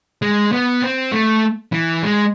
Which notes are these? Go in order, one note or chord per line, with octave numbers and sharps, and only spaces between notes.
G#3
B3
C4
A3
E3
G#3